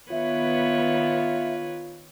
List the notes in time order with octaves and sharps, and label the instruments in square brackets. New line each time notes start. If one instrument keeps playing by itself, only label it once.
[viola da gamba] D#3 B4 C#5 [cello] B3 [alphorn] F4 [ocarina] E5